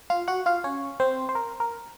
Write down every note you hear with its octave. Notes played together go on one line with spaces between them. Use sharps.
F4 F5
F#4 F#5
F4 F5
C#4 C#5
C4 C5
C5
A#4
A#4